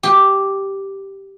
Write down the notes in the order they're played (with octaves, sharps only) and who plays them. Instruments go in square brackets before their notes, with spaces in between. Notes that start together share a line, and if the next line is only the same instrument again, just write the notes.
[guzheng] G4